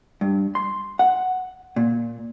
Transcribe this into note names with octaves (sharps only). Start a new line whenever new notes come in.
G2
C6
F#5
A#2